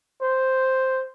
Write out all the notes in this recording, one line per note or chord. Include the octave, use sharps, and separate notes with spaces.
C5